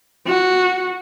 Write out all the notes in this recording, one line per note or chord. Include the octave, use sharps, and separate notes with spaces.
F#4